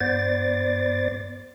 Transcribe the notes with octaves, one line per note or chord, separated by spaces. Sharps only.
G2 B3 C5 D5 A6